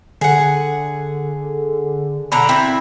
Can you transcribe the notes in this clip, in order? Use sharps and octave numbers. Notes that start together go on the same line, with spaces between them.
D3 G#4 F#5
B2 D3 A#5 B5
C4 E4 E5